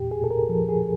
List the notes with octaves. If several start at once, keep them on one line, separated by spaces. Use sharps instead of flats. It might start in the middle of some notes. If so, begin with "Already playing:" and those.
Already playing: E2 A#2 G4
G#4
A#2 A4
A#4
F3 A4
G#4